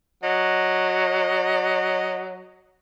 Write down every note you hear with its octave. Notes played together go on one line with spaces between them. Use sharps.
F#3 D#5